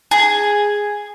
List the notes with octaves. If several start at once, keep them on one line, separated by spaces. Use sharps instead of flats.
G#4